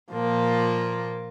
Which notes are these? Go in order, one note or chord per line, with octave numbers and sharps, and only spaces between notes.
A#2 F3 A#3 F4